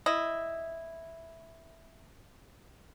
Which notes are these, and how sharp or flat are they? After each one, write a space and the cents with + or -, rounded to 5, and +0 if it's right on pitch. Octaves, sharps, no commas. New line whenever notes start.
E4 +0 D#5 +0